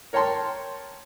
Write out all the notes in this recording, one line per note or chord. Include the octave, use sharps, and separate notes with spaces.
A#4 C#5 G5 A5 C6